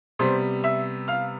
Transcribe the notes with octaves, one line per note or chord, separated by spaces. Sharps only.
C3 G3 B3 C5 C6
E5 E6
F5 F6